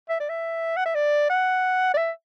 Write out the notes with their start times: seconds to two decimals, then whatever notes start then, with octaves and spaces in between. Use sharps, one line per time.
0.09 E5
0.20 D5
0.29 E5
0.76 F#5
0.85 E5
0.94 D5
1.30 F#5
1.94 D5
1.97 E5